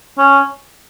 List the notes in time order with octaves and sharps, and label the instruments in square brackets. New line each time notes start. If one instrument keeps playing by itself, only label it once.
[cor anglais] C#4